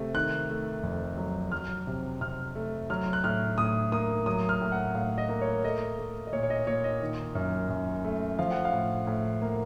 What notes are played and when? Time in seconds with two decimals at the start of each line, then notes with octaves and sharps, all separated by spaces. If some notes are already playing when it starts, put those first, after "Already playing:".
Already playing: C3 A3
0.14 D#3 F#6
0.50 A3
0.83 F2
1.17 F#3
1.52 F#3 F6
1.87 C3
2.21 C3 F6
2.55 A3
2.90 F#3 F6
3.13 F#6
3.24 A2 F6
3.58 A2 D#6
3.92 A#3 D#6
4.26 F#3 D#6
4.49 F6
4.61 A2
4.72 F#5
4.95 A2 F5
5.18 D#5
5.29 A#3
5.41 C#5
5.64 A3 D#5
5.98 A3
6.27 D#5
6.33 A#2 C#5
6.43 C#5
6.50 D#5
6.67 A#2 C#5
6.84 D#5
7.01 D#3
7.35 F#2
7.69 F#2
8.04 A3
8.39 F3 F5
8.51 F#5
8.65 F5
8.72 A2
9.07 A2
9.41 A#3